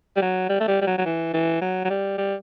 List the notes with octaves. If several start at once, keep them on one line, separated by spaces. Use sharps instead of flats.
G3
F#3
G3
A3
G3
G3
F#3
F#3
E3
E3
F#3
F#3
G3
G3